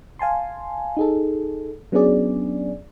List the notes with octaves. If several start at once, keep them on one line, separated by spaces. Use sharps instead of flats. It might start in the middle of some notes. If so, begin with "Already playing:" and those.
F5 G#5 A5 C6
D#4 G#4 A4
F#3 B3 C#4 D4 G#4 D5